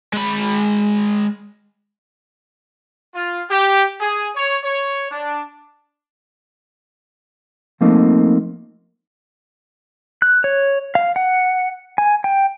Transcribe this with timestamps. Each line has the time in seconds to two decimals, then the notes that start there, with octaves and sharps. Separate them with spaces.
0.13 G#3 B5
3.15 F4
3.50 G4
4.01 G#4
4.35 C#5
4.64 C#5
5.10 D4
7.81 F3 A3 A#3 C4 D#4
10.22 F#6
10.44 C#5
10.95 F5
11.16 F#5
11.98 G#5
12.24 G5